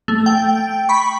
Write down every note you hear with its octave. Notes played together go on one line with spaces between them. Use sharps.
A3
G5
B5 C#6